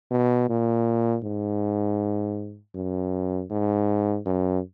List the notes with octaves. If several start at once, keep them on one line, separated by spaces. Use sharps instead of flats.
B2
A#2
G#2
F#2
G#2
F#2